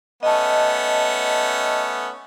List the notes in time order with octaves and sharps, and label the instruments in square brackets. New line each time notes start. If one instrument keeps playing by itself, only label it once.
[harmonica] A3 B3 C#4 [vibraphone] D#5 A5